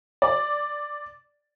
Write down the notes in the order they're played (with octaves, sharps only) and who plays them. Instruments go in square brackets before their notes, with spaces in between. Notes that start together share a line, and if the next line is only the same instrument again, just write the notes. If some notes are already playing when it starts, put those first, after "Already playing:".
[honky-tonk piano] D5